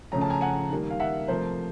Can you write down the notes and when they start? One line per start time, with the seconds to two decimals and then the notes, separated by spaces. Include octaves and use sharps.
0.12 C#3 F3 A3 C#4 A#5
0.21 A5
0.30 G#5 A#5
0.41 F#5 G#5
0.70 D#3 G3 A#3
0.90 F5
1.00 E5 F#5
1.28 C3 F3 A3 A#4 C5